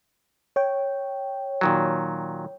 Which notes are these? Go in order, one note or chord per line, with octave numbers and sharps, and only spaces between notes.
C#5 G5
A#2 D#3 F#3